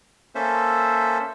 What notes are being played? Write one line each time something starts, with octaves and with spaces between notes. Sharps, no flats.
A#3 C#4 A4 C5 E5